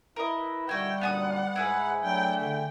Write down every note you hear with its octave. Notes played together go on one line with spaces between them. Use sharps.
E4 A#4 B4 D#5
B2 D3 D#3 G3 E4 F#4 G5
F#2 A#2 D3 B3 F#5 A5 D#6
G#2 E4 G#4 B4
F#3 A3 D4 G5
D3 G5